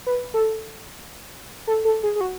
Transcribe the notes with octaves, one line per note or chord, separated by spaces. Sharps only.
B4
A4
A4
A4
G#4
G#4
F#4